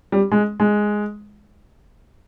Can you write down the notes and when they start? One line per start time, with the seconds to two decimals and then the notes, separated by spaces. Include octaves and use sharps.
0.12 G3
0.31 G#3
0.60 G#3